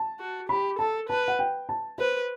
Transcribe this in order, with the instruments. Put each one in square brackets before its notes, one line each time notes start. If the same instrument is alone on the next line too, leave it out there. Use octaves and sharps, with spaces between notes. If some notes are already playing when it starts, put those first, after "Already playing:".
Already playing: [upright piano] A5
[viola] F#4
[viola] G4 [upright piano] B5
[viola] A4 [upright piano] A5
[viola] B4 [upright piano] A5
[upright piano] F#5
G5
A5
[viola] B4 [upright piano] C5